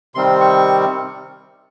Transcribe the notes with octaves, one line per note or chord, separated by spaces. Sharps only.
C3 D#3 G3 C4 C6
C#6